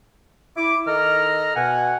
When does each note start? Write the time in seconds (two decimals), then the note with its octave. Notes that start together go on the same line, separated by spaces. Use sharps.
0.57 E4 D6
0.87 D#3 A4 D#5 A#5 F6
1.55 B2 F#5 G#5